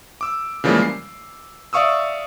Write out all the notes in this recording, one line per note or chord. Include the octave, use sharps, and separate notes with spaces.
D6 E6
C#3 E3 F3 G3 G#3 A#3
C7
D5 E5 F5 C#6 D#6 E6